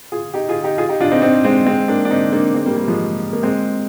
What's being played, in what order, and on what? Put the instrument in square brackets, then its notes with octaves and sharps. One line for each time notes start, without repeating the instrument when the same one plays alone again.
[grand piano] F4 G#4
D#4 G4
F4 G#4
D#4 G4
F4 G#4
D#4 G4
D4 F4
C4 D#4
C4 D#4
G#3 C4
G#3 C4
A#3 D4
D4
C4 D#4
A#3 D4
G#3 C4
G3 A#3
G3 A#3
F3 G#3
A#3
G#3 C4